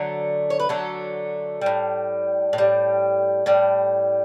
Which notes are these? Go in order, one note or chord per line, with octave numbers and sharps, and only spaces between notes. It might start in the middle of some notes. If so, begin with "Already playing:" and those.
Already playing: D3 F#3 A3
C#5
B4
D3 F#3 A3 A4
A2 G3
A2
G3
A2 G3